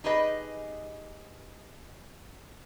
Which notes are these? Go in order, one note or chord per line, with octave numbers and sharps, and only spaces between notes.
D#4 G4 G#4 B4 D#5